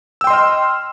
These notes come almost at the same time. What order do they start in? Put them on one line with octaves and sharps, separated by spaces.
E6 G5 C6 D#5 F6